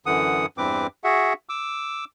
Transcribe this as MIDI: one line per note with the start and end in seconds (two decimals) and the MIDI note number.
0.06 0.46 42
0.06 0.46 50
0.06 0.46 52
0.06 0.46 78
0.06 0.46 87
0.58 0.87 40
0.58 0.87 43
0.58 0.87 52
0.58 0.87 60
0.58 0.87 71
0.58 0.87 86
1.04 1.33 66
1.04 1.33 68
1.04 1.33 76
1.04 1.33 78
1.49 2.05 86
1.49 2.05 88